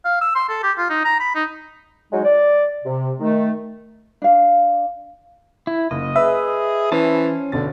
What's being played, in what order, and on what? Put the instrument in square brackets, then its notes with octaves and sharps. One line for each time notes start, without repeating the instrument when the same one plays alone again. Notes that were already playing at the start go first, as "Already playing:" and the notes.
[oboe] F5
E6
C6
A4
G4
F4
D#4
A#5
B5
D#4
[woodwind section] F#3 G#3 D#4
D5
C3
D#3 A3
[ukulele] D4 F5
[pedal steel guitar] E4
[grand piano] F#1 [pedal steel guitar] D#5
[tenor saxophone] G#4 [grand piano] B4 [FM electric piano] E5
[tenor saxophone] E3 [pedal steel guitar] C#4 C5 A5
[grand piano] G1 B2 A6 [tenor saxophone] D3